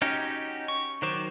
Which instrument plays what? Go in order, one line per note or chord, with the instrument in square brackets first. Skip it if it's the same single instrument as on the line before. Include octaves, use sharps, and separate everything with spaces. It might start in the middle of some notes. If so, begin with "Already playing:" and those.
[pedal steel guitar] C#4 D#4 F#4 G4
C#6
D#3 F#3 C5 D6